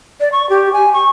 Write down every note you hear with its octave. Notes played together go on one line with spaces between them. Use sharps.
D5
C#6
G4
G#5
C#6